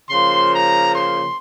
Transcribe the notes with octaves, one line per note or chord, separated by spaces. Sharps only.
C#3 F3 A#3 C6
A#5
C6